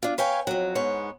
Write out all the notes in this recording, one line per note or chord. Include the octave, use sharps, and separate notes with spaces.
D4 F4
B4 C#5 F5 G5 G#5
F2 F#3
G#2 B3 C#5